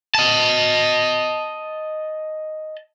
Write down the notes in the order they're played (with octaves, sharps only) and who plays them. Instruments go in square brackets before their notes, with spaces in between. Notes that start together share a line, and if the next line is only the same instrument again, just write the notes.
[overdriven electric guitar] D#5 A5